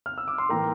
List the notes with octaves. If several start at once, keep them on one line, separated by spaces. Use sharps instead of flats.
F6
E6
D6
C6
A2 E3 A#3 G5 A#5